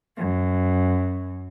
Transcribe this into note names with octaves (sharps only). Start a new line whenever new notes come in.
F#2